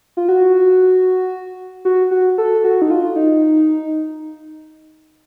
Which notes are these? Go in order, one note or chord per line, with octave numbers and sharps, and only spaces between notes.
F4
F#4
F#4
F#4
A4
F#4
D#4
F4
D#4